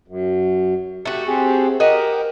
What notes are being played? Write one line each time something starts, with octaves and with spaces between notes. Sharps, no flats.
F#2
A3 F#4 G4
C4 G4 G#4
F#4 G4 A#4 D#5 F#5